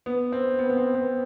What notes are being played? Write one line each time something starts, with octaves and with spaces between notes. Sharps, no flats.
B3
C4
B3
B3
C4
B3